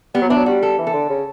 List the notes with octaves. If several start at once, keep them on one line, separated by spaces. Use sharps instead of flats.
G3 B3
F#3
E3 D4
F#3
G3 F#4
A4
E3
A4
D3
C#3